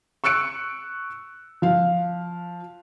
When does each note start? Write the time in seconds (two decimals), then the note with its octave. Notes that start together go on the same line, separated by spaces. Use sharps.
0.24 C#6 E6 F#6 C#7 D7
1.62 F3 F5